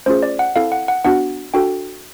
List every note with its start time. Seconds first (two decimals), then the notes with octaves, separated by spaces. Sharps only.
0.06 A3 C#4 F4 G#4 C5
0.23 D5
0.39 F#5
0.56 C4 E4 A4 F5
0.72 F#5
0.88 F#5
1.05 B3 D4 F#4 F#5
1.54 D4 F#4 A4 G5